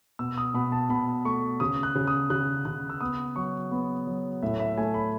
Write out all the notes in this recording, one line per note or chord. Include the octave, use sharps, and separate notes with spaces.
B2 E6
D#6
B2 B5
A5
B2 B5
A3 C#6
C#3 D#6
F#6
C#3
D#6
C#3 F#6
C#3 F#6
E6
B3 D#6
F#3 C#6
B3
F#3
A2 E5
E5
A3 G#5
B5